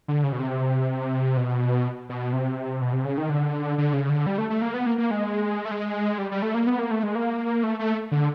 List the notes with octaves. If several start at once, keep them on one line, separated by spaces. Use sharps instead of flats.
D3
C#3
B2
C3
B2
B2
C3
B2
C3
C#3
D#3
D3
D3
C#3
D3
G3
A3
A3
A#3
B3
A#3
A#3
G#3
A3
G#3
G3
G3
A3
A#3
B3
A#3
A3
G#3
A#3
A3
A3
D3